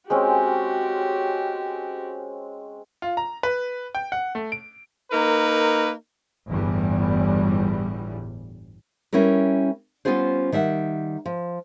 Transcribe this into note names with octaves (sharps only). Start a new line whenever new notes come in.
G#3 C4 C#4 F#4 G4
F4
A#5
B4
G5
F#5
A3
D7
A#3 D#4 A#4 B4
G1 E2 A2 G3
G3 C#4 E4 A#4 B4
G3 B3 C#4 F4 G#4 C5
D#3 G3 E5 F#5
F3